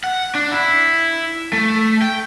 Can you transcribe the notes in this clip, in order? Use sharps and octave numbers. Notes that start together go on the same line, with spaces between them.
F#5
D4
E4
A3
G5